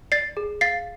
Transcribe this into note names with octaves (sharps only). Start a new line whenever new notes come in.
D5 A6 C7
G#4
F5 A6 C7